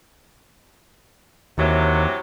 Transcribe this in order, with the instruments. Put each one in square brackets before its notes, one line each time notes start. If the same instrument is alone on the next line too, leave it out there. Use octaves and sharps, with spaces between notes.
[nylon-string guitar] D#2 [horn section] C3 E3 F#3